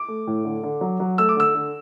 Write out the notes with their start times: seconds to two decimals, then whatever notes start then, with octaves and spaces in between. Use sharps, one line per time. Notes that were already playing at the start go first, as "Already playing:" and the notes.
Already playing: D6
0.08 A3
0.27 A2
0.45 D3
0.63 D3
0.81 F#3
1.00 F#3
1.18 A3 E6
1.29 D6
1.37 D3 E6
1.55 D3